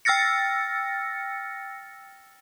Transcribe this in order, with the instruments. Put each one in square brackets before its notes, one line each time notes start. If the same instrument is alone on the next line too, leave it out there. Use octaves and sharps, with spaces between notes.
[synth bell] G5 E6 F6 A6 A#6 C#7